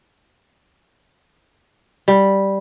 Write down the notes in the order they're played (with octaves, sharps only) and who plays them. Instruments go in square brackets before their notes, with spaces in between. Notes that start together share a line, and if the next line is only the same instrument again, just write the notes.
[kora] G3